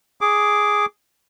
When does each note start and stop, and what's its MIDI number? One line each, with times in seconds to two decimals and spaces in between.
0.21 0.86 68
0.21 0.86 86